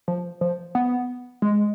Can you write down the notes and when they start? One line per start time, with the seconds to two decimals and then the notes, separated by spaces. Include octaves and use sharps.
0.08 F3
0.41 F3
0.75 B3
1.42 G#3